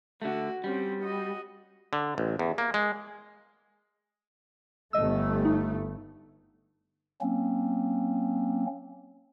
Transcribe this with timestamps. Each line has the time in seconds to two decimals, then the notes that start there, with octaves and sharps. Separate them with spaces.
0.22 D3 A3 F#4
0.64 G3 C4 C#4
1.03 F#4 D#5
1.93 D3
2.18 A1
2.39 E2
2.58 A#3
2.74 G#3
4.93 G1 A3 D#5 E6
5.45 D#4
7.21 F#3 A#3 C4 C#4